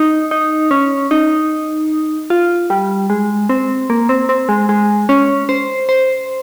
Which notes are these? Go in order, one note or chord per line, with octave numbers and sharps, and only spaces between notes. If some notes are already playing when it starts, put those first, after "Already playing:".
Already playing: D#4
D#4
C#4
D#4
F4
G3
G#3
C4
A#3
C4
C4
G#3
G#3
C#4
C5
C5